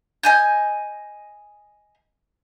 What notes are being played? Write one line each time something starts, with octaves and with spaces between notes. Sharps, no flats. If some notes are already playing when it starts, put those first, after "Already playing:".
D#5 G#5 G6